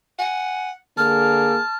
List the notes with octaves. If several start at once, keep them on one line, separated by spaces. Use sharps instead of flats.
F#5 G#5
D3 A#3 G#4 A5 F6